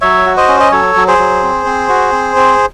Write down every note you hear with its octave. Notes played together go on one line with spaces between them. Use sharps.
F#3 C#5 E5
F#4
C5 D#5
C#4
D#5
F#3 A4 C#5
F#3
G#4 C5
F#3
C4
C4
F#4
C4
C4